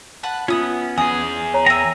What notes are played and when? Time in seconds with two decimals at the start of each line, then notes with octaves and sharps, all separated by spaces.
0.23 B4 F#5 A5
0.48 B3 C#4 E4 F4 D#6
0.98 E2 G#4 G#5 D#6
1.54 C#5 A#5
1.66 A#4 E5 G5 G#5 A#5